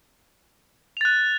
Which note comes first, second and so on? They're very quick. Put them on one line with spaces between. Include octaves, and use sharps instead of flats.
F7 A6 F#6